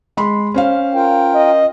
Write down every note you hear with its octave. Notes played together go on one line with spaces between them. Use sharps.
G#3 B5 C6
C#4 C5 F5
F4 A#4 G5
D#5